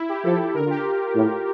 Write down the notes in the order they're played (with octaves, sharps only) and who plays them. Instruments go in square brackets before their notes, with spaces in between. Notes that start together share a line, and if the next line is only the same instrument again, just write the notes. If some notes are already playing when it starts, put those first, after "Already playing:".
Already playing: [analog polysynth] E4
G4
[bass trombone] F3 [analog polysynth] A4
[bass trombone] D3 [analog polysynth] A#4
[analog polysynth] F4
G4
[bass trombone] A2